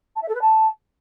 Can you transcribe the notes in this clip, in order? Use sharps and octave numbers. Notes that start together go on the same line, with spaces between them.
A5
E5
A4
B4
A5